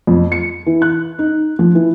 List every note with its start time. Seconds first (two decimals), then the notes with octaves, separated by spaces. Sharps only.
0.07 F2
0.32 C#7
0.66 E3
0.82 F#6
1.19 D#4
1.59 F3
1.75 E3